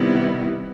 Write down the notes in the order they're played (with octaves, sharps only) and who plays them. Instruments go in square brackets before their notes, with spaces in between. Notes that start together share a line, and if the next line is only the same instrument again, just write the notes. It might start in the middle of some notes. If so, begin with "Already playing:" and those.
Already playing: [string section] C3 D#3 G3 B3 E4